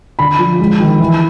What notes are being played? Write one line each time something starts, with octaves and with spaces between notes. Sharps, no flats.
D3 B5
F3
G#3
D#3
E3